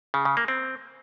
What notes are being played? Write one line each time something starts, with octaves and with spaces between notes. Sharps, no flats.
C#3
C#3
A#3
C4